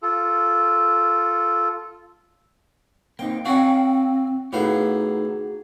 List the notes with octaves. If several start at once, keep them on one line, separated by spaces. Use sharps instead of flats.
F4 A4
A#3 C4 D#4 G5
C4 F#4 C#5 F5 G5 G#5
A2 B3 D#4 F#4 G#4 F5